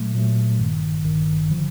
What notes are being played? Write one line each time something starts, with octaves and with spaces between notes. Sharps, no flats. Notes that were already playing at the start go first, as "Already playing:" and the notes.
Already playing: A#2 F#3 A3
A#2 F#3 A3
G#1 G2 D#3
G#1 G2 D#3
D3 F3